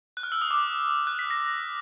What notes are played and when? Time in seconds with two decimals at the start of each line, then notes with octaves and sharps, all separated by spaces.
0.17 F#6
0.23 F6
0.32 E6
0.42 D#6
0.51 D6
1.07 F#6
1.19 B6
1.31 A#6